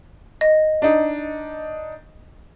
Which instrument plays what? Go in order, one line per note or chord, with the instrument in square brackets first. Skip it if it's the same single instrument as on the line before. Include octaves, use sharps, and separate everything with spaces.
[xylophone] D#5
[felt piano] D4 D#4